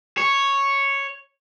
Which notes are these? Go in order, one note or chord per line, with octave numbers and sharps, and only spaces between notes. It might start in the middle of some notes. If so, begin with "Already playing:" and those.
C#5